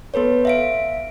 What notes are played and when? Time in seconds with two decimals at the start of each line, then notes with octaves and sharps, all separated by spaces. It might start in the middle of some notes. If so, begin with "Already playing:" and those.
0.14 B3 A4 B4 C#5
0.45 E5 F5 D7